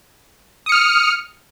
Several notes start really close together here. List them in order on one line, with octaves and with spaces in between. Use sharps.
D#6 C#7 F6